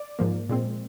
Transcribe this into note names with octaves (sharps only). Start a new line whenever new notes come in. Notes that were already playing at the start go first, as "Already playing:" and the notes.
Already playing: D5
G#2 F3 A#3
A#2 G#3 C4